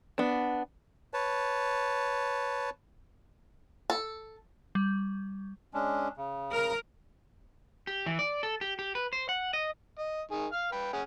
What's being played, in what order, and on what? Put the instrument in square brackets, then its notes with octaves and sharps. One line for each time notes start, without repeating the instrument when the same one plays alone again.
[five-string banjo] B3 D4
[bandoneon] B4 C#5 A5
[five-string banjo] A4
[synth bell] G3
[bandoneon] G#3 C#4 D4
C#3
[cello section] A#4
[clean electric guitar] G4
E3
D5
A4
G4
G4
B4
C5
F#5
D#5
[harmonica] D#5
D#3 G#4
F5 F6
B4 G5 B5
C#4 G#4 F#5